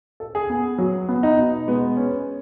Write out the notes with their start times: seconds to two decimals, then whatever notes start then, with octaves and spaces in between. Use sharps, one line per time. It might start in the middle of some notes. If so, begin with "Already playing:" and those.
0.20 A4
0.35 G#4
0.50 B3
0.78 F#3
1.09 B3
1.23 D#4
1.38 B2
1.68 G#3 B3
1.97 C#4